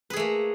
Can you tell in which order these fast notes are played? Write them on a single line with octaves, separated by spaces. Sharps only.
B4 G#4 A3 A#3